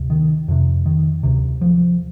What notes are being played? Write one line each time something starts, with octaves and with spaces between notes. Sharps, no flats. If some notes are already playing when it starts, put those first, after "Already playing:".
Already playing: D2 C3
D#3
F2 C3
D#3
D2 C3
F3